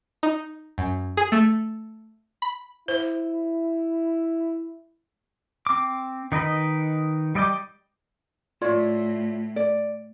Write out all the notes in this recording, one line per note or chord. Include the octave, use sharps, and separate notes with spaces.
D#4
F#2
G#4
A3
B5
E4 C5
C4 D6
D#3 D#4 A#4 B4 D#5
G3 D5 D#5 G5 D6
A2 F4 C#5 D5
D5